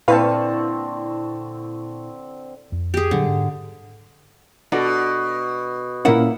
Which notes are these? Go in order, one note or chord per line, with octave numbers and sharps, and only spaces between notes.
A#2 D3 C4 E4 B4 F5 A5 C#6
F2
G4 G#4
A#2 D3 F#3 G3
G#2
B2 D4 F#4 A4
A#2 A#3 C#4 E4 F#5